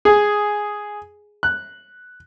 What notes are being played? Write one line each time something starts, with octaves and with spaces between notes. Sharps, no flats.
G#4
F#6